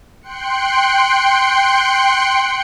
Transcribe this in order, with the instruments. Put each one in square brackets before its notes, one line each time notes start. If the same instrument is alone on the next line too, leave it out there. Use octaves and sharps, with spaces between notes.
[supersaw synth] G5 C6 F#6 C#7